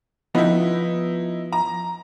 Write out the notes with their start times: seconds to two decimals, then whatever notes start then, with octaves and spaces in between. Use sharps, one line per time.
0.35 F3 B3 D#4 E4 B4
1.53 A#5